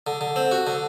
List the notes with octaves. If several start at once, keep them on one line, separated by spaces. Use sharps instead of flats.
D3
D3
C4
F#4
D3